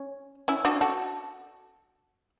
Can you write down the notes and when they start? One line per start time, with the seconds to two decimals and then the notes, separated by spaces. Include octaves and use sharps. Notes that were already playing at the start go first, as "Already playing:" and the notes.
Already playing: C#4
0.48 C#4 E4
0.65 D4 F#4
0.81 F#4 A4